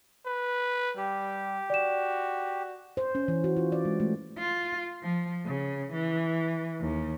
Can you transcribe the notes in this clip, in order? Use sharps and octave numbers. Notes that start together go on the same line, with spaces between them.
B4
G3 G4
F#4 D5 E7
C5
C#4
E3
F#4
F4
D5
G#3
A3
F4
F3
C#3
E3
D#2